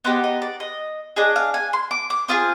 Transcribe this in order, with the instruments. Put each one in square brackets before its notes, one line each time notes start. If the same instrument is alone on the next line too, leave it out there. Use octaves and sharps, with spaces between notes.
[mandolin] B3 D#4 G4 C5
D#5
D5
D#5
D4 G#4 D#5
F5
G#5
C6
D6
D6
C4 F4 G#4 D#6